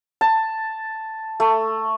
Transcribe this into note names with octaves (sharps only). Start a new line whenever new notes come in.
A5
A3